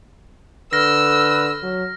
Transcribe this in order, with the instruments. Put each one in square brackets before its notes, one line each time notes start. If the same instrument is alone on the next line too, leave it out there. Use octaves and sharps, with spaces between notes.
[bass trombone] D3 [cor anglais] B4 [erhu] E6 [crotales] F6 A#6
[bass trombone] F#3